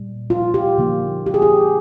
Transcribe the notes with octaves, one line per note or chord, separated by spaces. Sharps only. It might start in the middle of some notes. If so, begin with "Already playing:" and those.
Already playing: A#2 G3
F4
G4
D3 F3 A#3 D#4
G4
G#4
G4